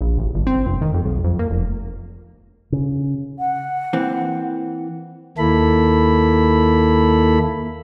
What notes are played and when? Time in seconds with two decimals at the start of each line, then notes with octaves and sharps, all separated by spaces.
0.01 A#1
0.18 A1
0.35 G1
0.47 C4
0.66 F1
0.81 D#3
0.94 F2
1.05 B1
1.24 F2
1.39 A#3
1.51 F1
2.72 C#3
3.39 F#5
3.93 E3 A#3 C4
5.38 D#2 A#3 E4 A4 B5